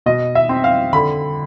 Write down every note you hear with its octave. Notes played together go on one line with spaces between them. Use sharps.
B2 D#5
E5
C4
F5
D3 B5